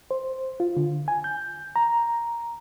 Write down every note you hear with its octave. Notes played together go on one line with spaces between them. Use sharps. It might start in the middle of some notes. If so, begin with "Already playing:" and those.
C5
F4
D3
G#5
G6
A#5